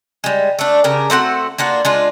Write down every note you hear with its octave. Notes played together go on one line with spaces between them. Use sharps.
G3 G#3
A3 D4
C#3 G4 A#4
A3 C4 F#4 F#5
A#3 D4 F4 F#4
G#3 D4 F4